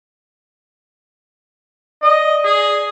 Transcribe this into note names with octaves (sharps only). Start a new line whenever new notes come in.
D5 D#5
G#4